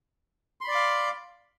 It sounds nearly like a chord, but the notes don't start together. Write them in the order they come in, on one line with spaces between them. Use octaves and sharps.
C6 B5 D5 D6 F5